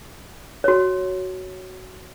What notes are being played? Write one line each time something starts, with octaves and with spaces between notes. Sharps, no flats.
F#4 C#5